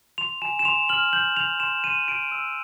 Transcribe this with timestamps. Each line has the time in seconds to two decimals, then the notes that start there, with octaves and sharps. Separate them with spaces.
0.18 C6 F7
0.42 G#5 E7
0.59 E7
0.65 C6 F7
0.89 F6 F#7
1.13 G6 F#7
1.36 G6 F7
1.60 C6 E7
1.84 C6 D#7
2.08 G6 D7
2.32 E6